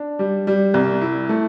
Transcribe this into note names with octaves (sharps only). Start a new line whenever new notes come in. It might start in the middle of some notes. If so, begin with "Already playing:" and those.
Already playing: D4
G3
G3
C2
E4
A3